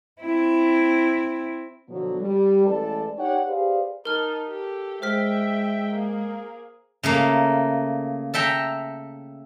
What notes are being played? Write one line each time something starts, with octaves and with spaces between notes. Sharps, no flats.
C4 E4
B2 D3 F3 F#3
G3
A1 G#3 A4 B4 D5 A5
D#4 G4 C#5 D5 F#5 G5
G4 G#4 B4 C5 D5 F5
D#4 A#4 A5 F6
G4 A4
G#3 C5 E5 G5 F6 B6
A#3 G#4
C#3 A3 A#3
A4 E5 G5 A#5